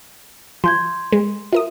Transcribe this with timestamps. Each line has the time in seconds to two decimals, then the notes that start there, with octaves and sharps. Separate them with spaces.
0.64 F3 C6 G6 G#6
1.12 G#3
1.53 F4 A#4 E5 D#6